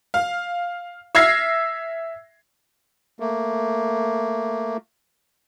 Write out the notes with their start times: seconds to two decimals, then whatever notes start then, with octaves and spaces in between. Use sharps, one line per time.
0.14 F5
1.15 E5 E6 F6 G#6 A#6 C7
3.20 A3 A#3